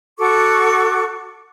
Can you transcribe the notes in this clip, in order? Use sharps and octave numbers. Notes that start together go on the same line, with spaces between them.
F#4 A4 C#6 D6